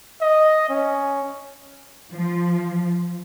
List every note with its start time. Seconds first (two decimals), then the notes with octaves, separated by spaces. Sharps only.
0.21 D#5
0.70 C#4
2.12 F3